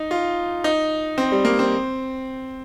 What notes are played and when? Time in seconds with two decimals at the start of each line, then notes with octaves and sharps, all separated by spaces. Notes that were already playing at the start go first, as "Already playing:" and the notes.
Already playing: D#4
0.11 F4
0.64 D#4
1.18 C4
1.32 G3
1.45 A#3
1.59 C4